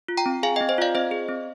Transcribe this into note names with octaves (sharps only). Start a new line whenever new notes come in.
F4
G5 A#5
C4
G#4 F5 G#5
D#5 G5
C4
C5 D#5
F4 D5 F5
C4 C5 D#5
G#4
C4